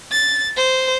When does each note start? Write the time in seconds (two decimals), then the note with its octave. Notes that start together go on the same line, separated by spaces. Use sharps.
0.12 A6
0.57 C5